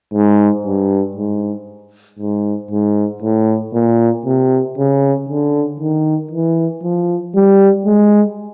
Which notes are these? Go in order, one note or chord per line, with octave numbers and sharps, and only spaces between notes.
G#2
G2
G#2
G#2
G#2
A2
A#2
C3
C#3
D3
D#3
E3
F3
G3
G#3